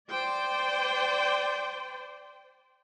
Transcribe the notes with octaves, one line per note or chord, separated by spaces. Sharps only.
C5 D5 G5